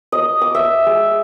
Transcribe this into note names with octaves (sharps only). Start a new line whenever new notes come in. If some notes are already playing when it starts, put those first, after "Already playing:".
D#5
D6
E5
G#3